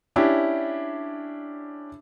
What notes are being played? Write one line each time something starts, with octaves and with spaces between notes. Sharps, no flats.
C#4 D4 E4 G4